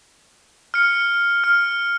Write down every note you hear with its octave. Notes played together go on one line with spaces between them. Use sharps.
F6 C#7
F6